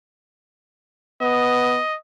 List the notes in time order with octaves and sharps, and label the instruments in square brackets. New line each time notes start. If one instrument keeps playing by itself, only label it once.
[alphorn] B3 [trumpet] D#5